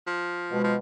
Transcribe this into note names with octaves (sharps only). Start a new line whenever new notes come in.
F3
B2 G#3
F3